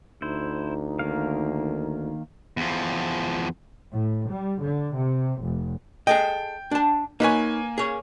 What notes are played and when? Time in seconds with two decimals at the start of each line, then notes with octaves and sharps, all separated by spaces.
0.22 D2 D#4 E4 C5
0.99 D#3 A#3 F5
2.57 E2 F3
3.92 A2
4.30 G3
4.61 D3
4.95 C3
5.41 F1
6.07 G#4 A4 D#5 G5
6.71 D4 A5
7.20 A#3 D#4 B4 C#5 G#5
7.78 G#4 C#5